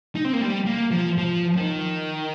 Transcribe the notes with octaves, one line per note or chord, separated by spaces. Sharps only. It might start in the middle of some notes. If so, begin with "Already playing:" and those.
D#4
C4
A#3
G3
A#3
F3
F3
D#3